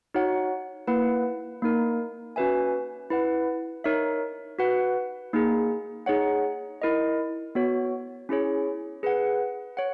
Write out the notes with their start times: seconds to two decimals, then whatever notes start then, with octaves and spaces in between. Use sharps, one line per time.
0.14 D#4 F#4 C#5 F#5
0.87 A#3 E4 B4 F#5
1.62 A#3 D#4 A#4
2.36 C#4 F#4 B4 E5 G#5
3.10 E4 B4 F#5
3.84 D#4 A#4 C#5 E5
4.59 F#4 B4 F#5
5.33 A#3 D#4 G#4
6.06 D#4 G#4 C#5 F#5
6.82 E4 A#4 D#5
7.55 B3 F#4 C#5
8.29 C#4 E4 G#4 C#5
9.03 G#4 B4 F#5
9.77 C#5 F#5